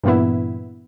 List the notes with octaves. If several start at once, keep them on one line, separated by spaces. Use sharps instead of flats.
G2 A#2 E3 B3 E4